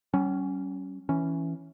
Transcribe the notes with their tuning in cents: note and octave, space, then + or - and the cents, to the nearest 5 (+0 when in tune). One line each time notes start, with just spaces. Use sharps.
G3 -45 C#4 +0
E3 +0 C#4 +0